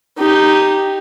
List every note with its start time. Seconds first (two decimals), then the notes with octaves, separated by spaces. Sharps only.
0.19 D#4 G4